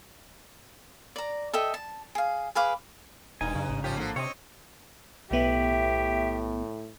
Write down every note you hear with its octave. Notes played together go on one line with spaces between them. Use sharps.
D5 A#5
A4 D#5 E5 G5
A5
G#4 F5
G#4 B4 F5 D6
E1 G2 D#4 G#5
F#2 C#3
A1 G#2
A#2 F3 C#4 G4
D3 F3 A#3
C3 C4 C#5 D#5
B1 A2 B3 G4 E5